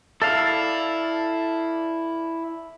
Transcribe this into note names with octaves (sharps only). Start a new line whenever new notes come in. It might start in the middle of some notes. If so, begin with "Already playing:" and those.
E4 A4 D5 F5